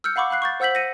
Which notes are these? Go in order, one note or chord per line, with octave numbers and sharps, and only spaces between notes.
E6 F6 G6 C#7
F5 F#5 B5 C#6 D6
F5 B5 F#6 C7
C#6 G6 A6
C5 F#5 E6 G6 B6 F#7
A#6 C#7 D#7